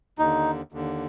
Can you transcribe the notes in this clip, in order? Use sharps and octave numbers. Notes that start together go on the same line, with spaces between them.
D#2 D3 D#4
D#2 D3